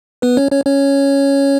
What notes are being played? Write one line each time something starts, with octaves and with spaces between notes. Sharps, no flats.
B3 B4
C#4 C#5
C#4 C#5
C#4 C#5